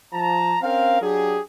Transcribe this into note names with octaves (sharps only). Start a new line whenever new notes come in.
F3 A5 A#5
C4 C#4 A#4 F5
F#3 D4 G4 G#4